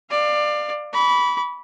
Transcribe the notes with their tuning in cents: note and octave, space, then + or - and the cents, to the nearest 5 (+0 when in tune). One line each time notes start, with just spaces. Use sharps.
D5 +25 F5 +0
B5 -10 D6 -45